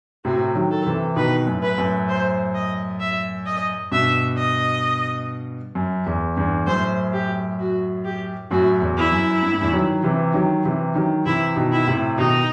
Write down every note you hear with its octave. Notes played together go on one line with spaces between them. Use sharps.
A2 C3 F#4
D#3 F#3
A4
C3 E3
B2 D#3 B4
F#2 A2
B4
F#2 A2
C5
D#5
E5
D#5
G2 B2 E5
D#5
F#2
E2
E2 G2
F#2 A2 C5
G4
F#4
G4
F#2 A2 F#4
E2
E4
F#2
G2
A2
E2 G2
D#3 F#3
C3 E3
D#3 F#3
C3 E3
D#3 F#3
C3 E3 E4
B2 D#3
E4
A2 C3
B2 D#3 D#4